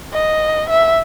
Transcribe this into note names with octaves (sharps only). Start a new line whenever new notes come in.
D#5
E5